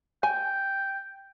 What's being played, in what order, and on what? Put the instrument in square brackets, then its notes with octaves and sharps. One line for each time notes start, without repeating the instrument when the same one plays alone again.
[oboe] G5 [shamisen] G#5